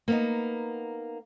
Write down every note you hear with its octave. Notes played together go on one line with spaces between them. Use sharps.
A#3 B3 D#4